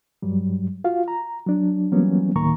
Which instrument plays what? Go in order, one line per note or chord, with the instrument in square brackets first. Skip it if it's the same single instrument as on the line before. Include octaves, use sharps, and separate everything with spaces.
[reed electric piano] G2 F#3 G3
F4 F#4 F5
A#5
F#3 D4
E3 F#3 G3 A#3 B3 C#4
D2 A2 D#3 A#3 A#5 C#6